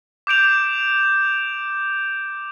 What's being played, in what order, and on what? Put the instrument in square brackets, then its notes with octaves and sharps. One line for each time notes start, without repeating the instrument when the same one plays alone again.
[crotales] D6 G6 D7 F7